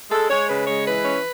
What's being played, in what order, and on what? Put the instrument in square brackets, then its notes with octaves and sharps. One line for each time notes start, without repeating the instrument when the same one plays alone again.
[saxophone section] G#3 A4
G#3 C#5
C#3 B4
G#3 C#5
E3 B4
C#4